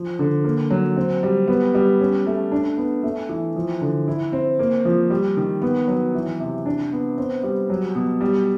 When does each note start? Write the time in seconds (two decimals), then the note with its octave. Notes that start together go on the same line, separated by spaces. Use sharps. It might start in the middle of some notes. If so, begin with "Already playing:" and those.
Already playing: F3
0.19 D3
0.44 A#3
0.70 F#3
0.96 C4
1.23 G3
1.48 B3
1.75 G3
2.00 C#4
2.26 A3
2.52 D4
2.77 B3
3.03 A3
3.29 E3
3.56 F3
3.81 D3
4.08 E4
4.32 C4
4.59 A#3
4.85 F3
5.10 G3
5.37 D#3
5.62 B3
5.88 F#3
6.14 E3
6.40 C3
6.66 D4
6.92 B3
7.18 C4
7.43 G3
7.70 F#3
7.95 B2
8.21 G3